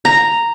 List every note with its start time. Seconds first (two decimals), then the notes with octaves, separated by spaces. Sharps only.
0.05 A#5